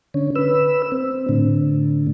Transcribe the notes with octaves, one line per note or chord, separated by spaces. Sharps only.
D3 C#4
B4 E6
C4
A2 D3